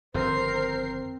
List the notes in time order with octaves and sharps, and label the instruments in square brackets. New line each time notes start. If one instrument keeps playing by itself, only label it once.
[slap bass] G1 F2 D#3 [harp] C4 [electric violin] A#4 C7 [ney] C5